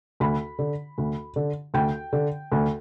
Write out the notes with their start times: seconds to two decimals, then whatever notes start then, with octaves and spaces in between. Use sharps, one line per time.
0.20 D2 B5
0.59 D3
0.98 D2
1.36 D3
1.74 D2 G5
2.13 D3
2.52 D2